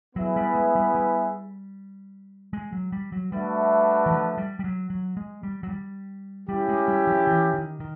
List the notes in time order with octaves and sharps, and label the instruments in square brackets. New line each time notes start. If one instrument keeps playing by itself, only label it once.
[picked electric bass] F#3 [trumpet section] B3 E4 G#4 B4 E5
[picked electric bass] G3
G#3
G3
G3
G#3
F#3
G3
F#3
[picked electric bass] G3 [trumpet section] A3 D4 F#4 B4 E5
[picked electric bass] E3
F3
G3
G3
F#3
F#3
G#3
G3
F#3
G3
[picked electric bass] G3 [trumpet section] C#4 E4 G4
[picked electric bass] G#3
G3
F3
E3
D#3
D#3